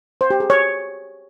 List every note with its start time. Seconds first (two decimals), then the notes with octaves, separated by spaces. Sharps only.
0.21 C5
0.30 G4
0.40 G#4
0.50 C#5